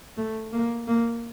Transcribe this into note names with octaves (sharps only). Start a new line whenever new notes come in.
A3
A#3
A#3